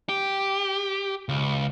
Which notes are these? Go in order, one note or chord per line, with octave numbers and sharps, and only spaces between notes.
G4
C#2